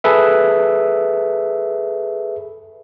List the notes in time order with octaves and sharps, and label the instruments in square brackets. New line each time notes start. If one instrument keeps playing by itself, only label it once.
[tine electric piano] G#4 A4 B4 E5